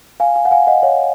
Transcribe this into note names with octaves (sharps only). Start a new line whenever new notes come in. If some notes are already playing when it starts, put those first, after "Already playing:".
F5 G#5
F5 G#5
F#5
F5 G#5
D#5 F#5
C#5 F5